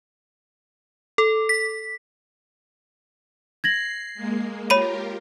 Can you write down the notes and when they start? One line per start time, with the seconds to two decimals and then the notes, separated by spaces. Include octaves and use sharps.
1.18 A4
1.49 B6
3.64 G#6 A#6 C7 F#7
4.15 G#3 A#3
4.70 F4 G4 A#4 C#5 B5 D#7